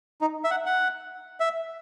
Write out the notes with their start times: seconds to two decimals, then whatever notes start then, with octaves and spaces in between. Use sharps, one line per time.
0.21 D#4
0.44 E5
0.51 F#5
0.66 F#5
1.40 E5